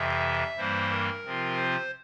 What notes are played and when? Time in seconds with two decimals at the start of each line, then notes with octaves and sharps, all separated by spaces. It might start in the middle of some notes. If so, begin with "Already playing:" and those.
Already playing: F2 C3 E3 E5
0.57 G2 E3 G3 A#3 C5
0.90 A#4
1.24 C3 F3 C4 F4
1.56 C5